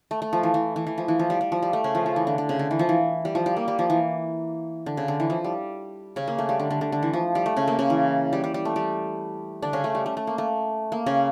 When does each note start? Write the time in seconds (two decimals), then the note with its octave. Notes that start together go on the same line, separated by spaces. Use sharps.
0.11 A3
0.22 A3
0.33 F3
0.43 E3
0.54 E3
0.76 E3
0.87 E3
0.98 F3
1.08 E3
1.19 F3
1.30 G3
1.41 G3
1.52 F3
1.62 G3
1.73 A3
1.84 C#3 C#4
1.95 F3
2.06 F3
2.16 E3
2.27 D3
2.38 D3
2.49 C#3
2.59 D3
2.71 E3
2.79 F3
2.89 E3
3.25 G3
3.35 F3
3.46 G3
3.57 A#3
3.68 G3
3.79 F3
3.90 E3
4.86 D3
4.97 C#3
5.08 D3
5.20 E3
5.30 F3
5.44 G3
6.16 C#3 C#4
6.28 A#3
6.38 A3
6.49 G3
6.60 D3
6.71 D3
6.81 D3
6.92 D3
7.03 E3
7.13 F3
7.35 G3
7.46 A3
7.56 C#3 C#4
7.68 A#3
7.79 C#3 C#4
7.90 E3
8.33 G3
8.44 G3
8.54 G3
8.65 A3
8.76 G3
9.62 D3 D4
9.73 C#3 C#4
9.84 A3
9.95 G3
10.06 A3
10.17 A3
10.27 A#3
10.38 A3
10.92 A#3
11.06 C#3 C#4